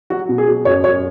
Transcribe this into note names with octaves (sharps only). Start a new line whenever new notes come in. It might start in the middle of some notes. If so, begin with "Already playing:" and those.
F#3 F#4
B2
G#4
F#3
F#2 C#5
F#2 C#5